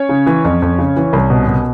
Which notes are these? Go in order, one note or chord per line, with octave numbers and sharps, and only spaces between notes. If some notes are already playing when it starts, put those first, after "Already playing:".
Already playing: C#4 C#5
C#3
E3
F2
F2
C#3
E3
C2
B2
B2